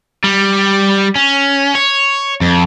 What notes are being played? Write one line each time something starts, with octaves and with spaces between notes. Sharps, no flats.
G3
C#4
C#5
F2